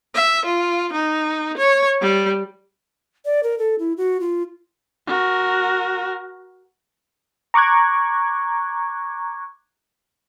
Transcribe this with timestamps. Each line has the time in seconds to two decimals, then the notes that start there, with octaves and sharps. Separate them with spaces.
0.15 E5
0.46 F4
0.93 D#4
1.58 C#5
2.01 G3
3.25 D5
3.43 A#4
3.59 A4
3.79 E4
3.97 F#4
4.20 F4
5.07 F#4 A#4
7.54 A#5 C#6 D6 F#6 G#6